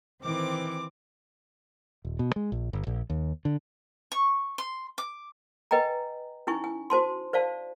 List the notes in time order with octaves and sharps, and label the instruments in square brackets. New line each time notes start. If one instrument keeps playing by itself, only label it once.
[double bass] D#3 E3 [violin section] C4 D6
[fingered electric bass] D#1
B2
G#3
A#1
G1
A#1
D#2
D3
[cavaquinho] C#6
C6
D6
[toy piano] B4 D#5 G5 G#5 A#5
C#4 D#4 E4 G#5 C#6
G#5
F#4 C5 A5 C6
C5 D5 F5 A5